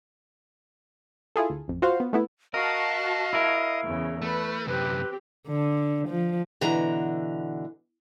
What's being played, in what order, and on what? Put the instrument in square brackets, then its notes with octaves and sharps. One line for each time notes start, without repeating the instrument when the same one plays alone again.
[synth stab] E4 F4 G#4 A4
D2
A1 F2
F4 F#4 C5 F5
B3
A3 B3 E4
[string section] F#4 A5 [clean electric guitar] A#4 [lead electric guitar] D#5 [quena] F5
[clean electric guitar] E4 G#4 A#4
[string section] E2 C#3
[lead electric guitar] A3 [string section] B4
[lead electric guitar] F#2 C3 [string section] C4 G4 [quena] B4
[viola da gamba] D3
F3
[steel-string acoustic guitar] B2 D3 E3 F#4 A#5